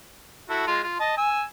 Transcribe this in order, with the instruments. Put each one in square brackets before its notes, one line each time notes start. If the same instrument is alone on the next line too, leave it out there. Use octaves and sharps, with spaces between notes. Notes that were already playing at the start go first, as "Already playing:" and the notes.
[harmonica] E4 F#4 A4
G#3 F4
F4
D#5 A5
G#5 E6